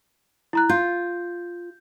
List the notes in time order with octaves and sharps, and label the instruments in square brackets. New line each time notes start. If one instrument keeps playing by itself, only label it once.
[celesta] E4 A#5 F#6
[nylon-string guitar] F4 [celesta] G6